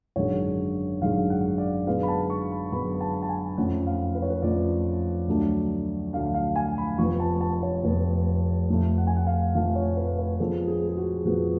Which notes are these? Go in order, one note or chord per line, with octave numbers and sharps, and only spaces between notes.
G#1 F#2 D3 G#3 C#5
G#1 F#2 D3 G#3 F5
F#5
D5
F#2 D3 G#3 B3 F5
B5
A5
C#6
B5
F#2 D3 G#3 B3 B5
A5
A5
G#5
F2 F3 A3 C#4 F#5
F5
B4
C#5
B4
F2 F3 A3 C#4 D5
D2 D3 F#3 A3 D4
D2 D3 F#3 A3 D4 F5
F5
G#5
B5
F1 F2 F3 B3 C#6
A5
A5
C#5
F1 F2 F3 B3 B4
F1 F2 F3 A3
F#5
G#5
F#5
F5
F1 F2 F3 A3 F5
C#5
B4
B4
F2 F3 G#3 B3 A4
G#4
G#4
F#4
F2 F3 G#3 B3 F#4